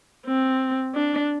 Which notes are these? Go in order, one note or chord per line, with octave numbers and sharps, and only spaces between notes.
C4
D4